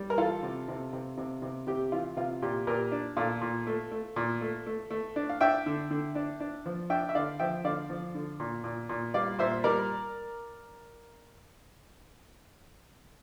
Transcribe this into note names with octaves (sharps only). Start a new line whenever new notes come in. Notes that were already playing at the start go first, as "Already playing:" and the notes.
Already playing: G3
A#4
E3 F4 A4
C3
C3
C3
C3
C3
C3 G4
E3 F4
C3 F4
A#2 G4
A#2 G4 A#4
D4
A#2 F4 A4
A#2
A3
A3
A#2
A3
A3
A3
D4
F5
D4 E5 G5
D3
D3
D4
D4
F3
D4 E5 G5
E5
D3 D5 F5
F3 E5 G5
D3 D5 F5
F3
D3
A#2
A#2
A#2
G3 D5 F5
A#2 C5 E5
G3 A#4 D5